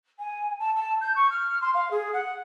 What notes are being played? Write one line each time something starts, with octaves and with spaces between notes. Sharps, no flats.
G#5
A5
A5
G6
C#6
F6
C6
F5
G#4
F#5